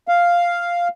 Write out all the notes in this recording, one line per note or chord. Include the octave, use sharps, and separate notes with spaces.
F5